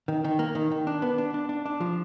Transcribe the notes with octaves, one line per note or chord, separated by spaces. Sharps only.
D#3
D#3
A#3
D#3
D#3
D4
B3
D4
D4
D4
D4
F3